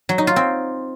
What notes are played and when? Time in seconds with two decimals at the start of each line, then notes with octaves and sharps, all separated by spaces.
0.09 F#3
0.18 D#4
0.27 F4
0.36 C4